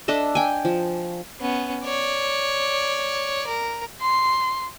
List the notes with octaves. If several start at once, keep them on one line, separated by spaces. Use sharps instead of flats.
D4 A4 D#5 E5
G5 G#5
F3
B3 C#4
C#5 D5
A#4
C6